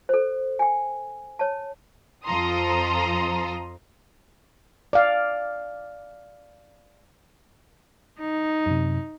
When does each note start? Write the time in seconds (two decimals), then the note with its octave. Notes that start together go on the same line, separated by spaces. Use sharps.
0.09 A4 C5
0.59 G5 G#5
1.39 C#5 A5
2.26 F2 F3 A4 A#5 C6 D#6
4.93 D5 F5
8.20 D#4
8.66 F#2 C3